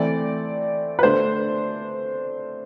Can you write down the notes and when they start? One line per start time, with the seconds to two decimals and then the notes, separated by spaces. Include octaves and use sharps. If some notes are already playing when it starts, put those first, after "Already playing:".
Already playing: E3 A3 C4 D5
0.99 B4
1.03 D3 A3 D4 C5